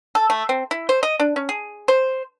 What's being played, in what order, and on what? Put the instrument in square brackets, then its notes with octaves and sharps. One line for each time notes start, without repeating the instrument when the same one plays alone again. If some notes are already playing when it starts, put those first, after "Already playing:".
[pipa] A4
A3
C4
E4
C5
D#5
D4
C#4
G#4
C5